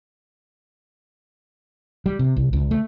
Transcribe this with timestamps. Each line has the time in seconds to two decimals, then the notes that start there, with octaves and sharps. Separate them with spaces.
2.06 G3
2.19 C3
2.37 C2
2.53 C#2
2.71 A3